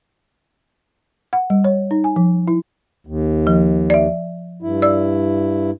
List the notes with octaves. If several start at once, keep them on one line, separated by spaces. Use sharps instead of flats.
F#5
G3
C#5
D#4
G#5
F3
E4
D#2
F3
D5 E5
G2 E4
D5 E6